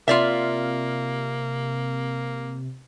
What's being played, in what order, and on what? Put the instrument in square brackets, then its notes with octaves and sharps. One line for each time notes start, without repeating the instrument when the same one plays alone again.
[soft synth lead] C3 [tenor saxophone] A#3 [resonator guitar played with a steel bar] F4 D5 E5